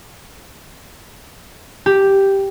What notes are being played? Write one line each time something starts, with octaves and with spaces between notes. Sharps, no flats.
G4